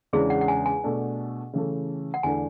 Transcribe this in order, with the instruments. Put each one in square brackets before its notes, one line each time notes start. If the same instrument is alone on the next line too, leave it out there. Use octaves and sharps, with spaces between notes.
[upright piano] E2 C#3 G#3 D4 [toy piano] G#4
[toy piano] F#5
F#5
G#5
G#5
[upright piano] B2 A3 D4
C#3 E3 A3
[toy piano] F#5
[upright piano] E2 D3 A3 D4 [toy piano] G#5